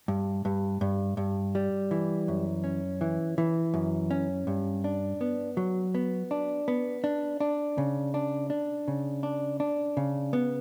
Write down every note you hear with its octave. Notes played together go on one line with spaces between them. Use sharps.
G2
G2
G2
G2
G3
E3
F#2
C#4
E3
E3
F#2
C#4
G2
D4
B3
F#3
B3
D4
B3
D4
D4
C#3
D4
D4
C#3
D4
D4
C#3
B3